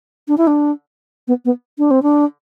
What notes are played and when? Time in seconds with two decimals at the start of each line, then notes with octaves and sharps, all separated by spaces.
0.28 D4
0.38 E4
0.47 D4
1.28 B3
1.45 B3
1.78 D4
1.91 C4
2.02 D4